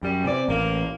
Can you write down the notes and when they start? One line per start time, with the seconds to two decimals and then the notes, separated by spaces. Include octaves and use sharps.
0.03 F#2 G3
0.25 C3 E3 D5
0.49 A1 A#3